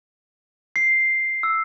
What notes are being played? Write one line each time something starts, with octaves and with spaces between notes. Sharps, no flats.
C7
E6